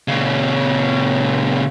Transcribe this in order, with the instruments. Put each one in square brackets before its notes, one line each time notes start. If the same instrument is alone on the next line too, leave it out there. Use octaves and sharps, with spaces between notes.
[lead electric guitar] A#2 C#3